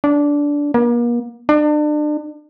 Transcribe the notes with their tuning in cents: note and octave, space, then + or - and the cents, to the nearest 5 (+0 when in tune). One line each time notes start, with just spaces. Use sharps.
D4 -15
A#3 +40
D4 +35